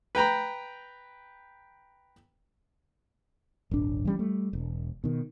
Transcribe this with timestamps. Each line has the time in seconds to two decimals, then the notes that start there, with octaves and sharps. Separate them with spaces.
0.15 B4 G5 A#5 B5
3.71 D#1 G#1 D4
4.05 E3 G3 C#4
4.19 G3 A3
4.53 E1
5.04 B2 D#3